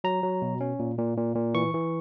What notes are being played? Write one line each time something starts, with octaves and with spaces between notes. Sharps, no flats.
F#3 A#5
F#3
B2
C#4
A#2
A#2
A#2
A#2
E3 C#6
E3